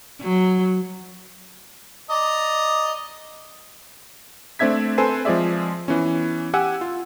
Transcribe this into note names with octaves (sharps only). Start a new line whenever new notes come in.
F#3
D5 D#5 A#5
A3 C4 D4 E5 G#6 B6
C4 A4 B4 C5 G#5 C7
F3 G#3 C4 G#4 D5 E5
E3 B3 C#4
G4 F#5 G#5 E6
F4